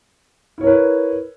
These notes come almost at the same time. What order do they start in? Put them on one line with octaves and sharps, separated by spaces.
E4 C#5 A#4 B4